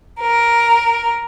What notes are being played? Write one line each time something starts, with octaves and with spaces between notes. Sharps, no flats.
A#4